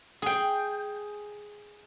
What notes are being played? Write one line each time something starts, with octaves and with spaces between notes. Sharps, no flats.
G#4 G5